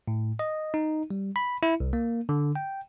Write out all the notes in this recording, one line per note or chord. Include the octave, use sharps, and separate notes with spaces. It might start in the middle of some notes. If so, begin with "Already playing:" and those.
A2
D#5
D#4
G3
B5
E4
C2
A#3
D3
G5